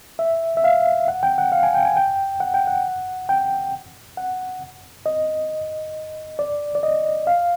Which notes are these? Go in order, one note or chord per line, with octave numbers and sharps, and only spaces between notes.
E5
E5
F5
F#5
G5
F#5
F5
G#5
G5
G#5
G5
F#5
G5
F#5
G5
F#5
D#5
D5
D5
D#5
F5